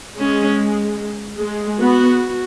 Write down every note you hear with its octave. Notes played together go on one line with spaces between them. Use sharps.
G#3 C#4
G#3
B3 F#4